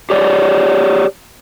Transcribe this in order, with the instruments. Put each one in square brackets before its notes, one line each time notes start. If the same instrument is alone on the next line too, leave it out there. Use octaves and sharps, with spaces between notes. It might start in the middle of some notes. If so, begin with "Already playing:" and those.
[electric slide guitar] G4 G#4 C#5 D5